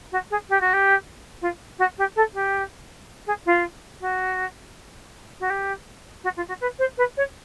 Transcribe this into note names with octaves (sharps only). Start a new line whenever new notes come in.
F#4
G#4
G4
F#4
G4
F4
F#4
G4
A4
G4
G#4
F4
F#4
F#4
G4
F#4
F4
F#4
B4
C5
B4
C#5